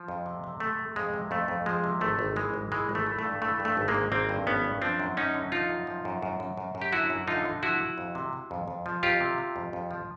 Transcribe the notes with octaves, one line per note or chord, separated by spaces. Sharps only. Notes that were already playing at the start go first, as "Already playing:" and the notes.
Already playing: F3
F2
C3
C3
C3 A3
C3
F2 G#3
C3
F2 A3
F2
F3 G#3
C3
G#1 A3
G#1
E3 G#3
G#1
E3 G#3
G#1
A3
E3
A3
G2
E3 A3
G2
A3
G#1
G#3 A#3
G#1
G#1 A#3 C4
G2
G#1 B3 C#4
G2
F3 C4 D4
F#2
F#2 C#4 D#4
D3
F3 D#4 F4
F#2
F3
F#2
F#2
F#2
F#2
F#2
G4
D3 E4 F#4
F#2
D3 D#4 F4
D3
F3 E4 F#4
F3
F2
C3
C3
F2
F2
F3
F2 F4 G4
C3
C3
F2
F2
F3